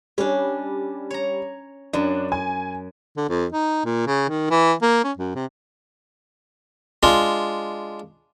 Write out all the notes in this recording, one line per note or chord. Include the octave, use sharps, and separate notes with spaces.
G3 C#4 D4
C#5 A#5
F#2 D4
G#5
D3
F2
D#4
A#2
C#3
D#3
E3
A#3
C#4
F#2
C3
G#3 D4 F4